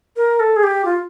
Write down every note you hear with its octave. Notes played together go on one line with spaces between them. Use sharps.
A#4
A4
G#4
G4
F4